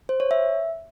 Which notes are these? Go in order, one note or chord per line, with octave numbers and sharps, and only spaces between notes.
C5
C#5
E5